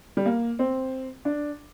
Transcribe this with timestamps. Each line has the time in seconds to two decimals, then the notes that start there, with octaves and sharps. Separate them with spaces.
0.17 G3
0.26 A#3
0.59 C4
1.25 D4